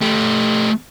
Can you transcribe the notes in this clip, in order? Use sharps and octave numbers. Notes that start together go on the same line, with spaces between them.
A3 G4